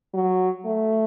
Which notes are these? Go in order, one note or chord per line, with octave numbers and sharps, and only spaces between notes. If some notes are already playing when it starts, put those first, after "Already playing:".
F#3
A3